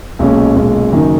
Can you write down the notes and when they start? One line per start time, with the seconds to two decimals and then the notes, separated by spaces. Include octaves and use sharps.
0.19 B1 A#2 G#3 C#4
0.56 B1 A#2 G#3 C#4
0.92 F#1 F#2 D#3 A#3 D#4